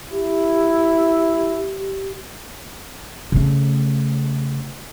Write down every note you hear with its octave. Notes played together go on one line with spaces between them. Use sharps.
E4 G4
C#3 A3